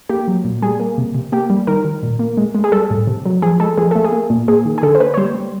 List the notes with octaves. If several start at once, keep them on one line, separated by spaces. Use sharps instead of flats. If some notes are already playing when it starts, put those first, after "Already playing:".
A#3 G4
F#3
A#2
G3 G#4
A#3
C3
C3
A#3 G4
G3
D#3 A#4
D#3
A#2
A#3
G#3
G#3
G#4
G3 A4
A2
C3
F#3
F3 G#4
G#3 A4
F3 G#4
A3 A4
G#4
A#3
A#2
A#3 G#4
D#3
G#4
D3 A4
C5
A#3 B4
C#5
G3 C5
G3